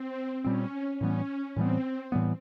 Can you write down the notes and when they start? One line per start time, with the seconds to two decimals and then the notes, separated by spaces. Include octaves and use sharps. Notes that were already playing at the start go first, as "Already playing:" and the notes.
Already playing: C4
0.45 A#2 G3 C4 C#4
1.00 A2 E3 G3 B3 C#4
1.56 A2 E3 G3 B3 C4
2.12 A2 E3 G3 B3